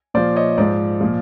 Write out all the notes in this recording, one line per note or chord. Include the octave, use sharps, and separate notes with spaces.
A#2 F3 C5 D5
C#5 D#5
G#2 F3 C5 D5
A#2 F3